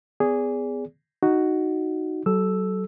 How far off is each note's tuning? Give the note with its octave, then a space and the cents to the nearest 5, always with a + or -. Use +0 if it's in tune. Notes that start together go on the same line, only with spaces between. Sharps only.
B3 +30 G#4 -10 D5 -30
D#4 +0 F#4 +5
F#3 +35 A4 -20 E6 +0